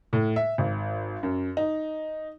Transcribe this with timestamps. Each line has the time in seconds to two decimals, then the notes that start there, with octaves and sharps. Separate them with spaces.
0.13 A2
0.36 E5
0.58 G#1
1.23 F#2
1.57 D#4